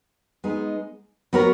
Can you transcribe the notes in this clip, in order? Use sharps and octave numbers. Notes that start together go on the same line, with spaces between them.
G#3 B3 D#4
F#3 B3 F#4 A#4 C#5